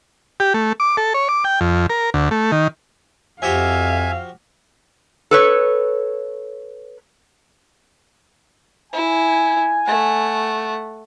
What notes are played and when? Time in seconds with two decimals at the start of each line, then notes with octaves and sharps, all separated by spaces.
0.40 G4
0.54 A3
0.80 D6
0.97 A4
1.14 C#5
1.29 D6
1.44 G5
1.61 F2
1.90 A#4
2.14 D2
2.31 A3
2.52 D#3
3.42 F2 F3 F#4 G4 E5 F5 G#5
5.31 A4 B4 C#5
8.93 E4 G#5
9.86 A3 F#5